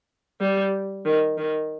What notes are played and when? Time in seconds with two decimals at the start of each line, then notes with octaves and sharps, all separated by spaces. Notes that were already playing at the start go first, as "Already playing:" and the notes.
0.41 G3
1.05 D#3
1.37 D#3